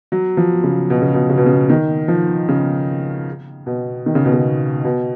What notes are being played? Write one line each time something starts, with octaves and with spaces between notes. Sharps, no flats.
F#3
F3
C#3
B2
C#3
B2
C#3
B2
C#3
D#3
F3
C#3
B2
D#3
C#3
B2
C#3
B2